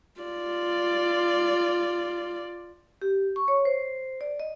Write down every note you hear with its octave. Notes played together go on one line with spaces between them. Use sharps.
F4 D5
G4
C#6
C#5
C5
D5
D#5